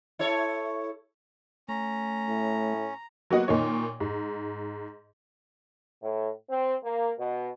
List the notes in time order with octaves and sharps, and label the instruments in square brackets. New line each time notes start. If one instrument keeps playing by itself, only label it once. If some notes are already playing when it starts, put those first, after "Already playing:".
[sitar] E4 A4 C#5
[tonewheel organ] A3 [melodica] C#4 [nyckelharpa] A#5
[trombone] A2
[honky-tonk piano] F#3 A#3 B3 F#4 D#5 F#5
A#2 D#3 A#3 D#4 C#5
G#2
[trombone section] A2
C4
A#3
B2